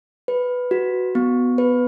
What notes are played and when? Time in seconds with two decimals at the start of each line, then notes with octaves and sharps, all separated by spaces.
0.28 B4
0.71 F#4
1.15 B3
1.58 B4